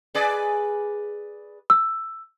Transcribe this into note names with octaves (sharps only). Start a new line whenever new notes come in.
G#4 B4 D5
E6